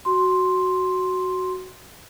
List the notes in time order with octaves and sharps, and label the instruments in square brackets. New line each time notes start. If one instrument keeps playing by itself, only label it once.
[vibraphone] F#4 C6